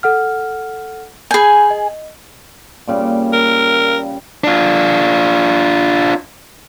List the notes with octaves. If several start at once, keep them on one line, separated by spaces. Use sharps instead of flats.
A4 F#5 F6
G#4 G#5 B5 G6
D#5
A#2 C#3 G3
A#4
D4 F4